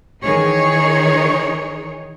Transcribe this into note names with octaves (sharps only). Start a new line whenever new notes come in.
D#3 E3 D#4 G#4 C#5